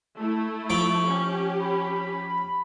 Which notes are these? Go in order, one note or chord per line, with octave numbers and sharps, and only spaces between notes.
A3 E4
F3 G5 C#6 D6
C#4 G4
B5